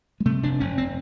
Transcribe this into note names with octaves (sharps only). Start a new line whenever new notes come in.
G#3
C3 A3
F1 D4
F1 C#4
C4